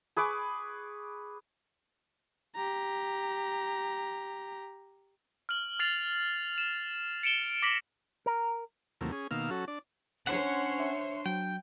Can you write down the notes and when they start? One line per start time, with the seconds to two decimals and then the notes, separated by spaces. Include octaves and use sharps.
0.17 G#4 B4 C#6 D6
2.55 G4 A#5
5.49 F6 F#7
5.79 F6 A6 C7 F7
6.58 E7
7.23 C#7 D7 E7 G7
7.62 D6 A#6 B6 F#7 G7
8.26 A#4
9.01 D#2 C3 E3 F#3 A3 A#3
9.12 C#4 G#4
9.31 B2 D#3 A#3 F5 E6 F6
9.50 F#3 C#4 F#4 A4
9.68 D4 D5
10.27 C#4 D4 C5 C#5 F#5
10.80 E5
11.26 F#3 G5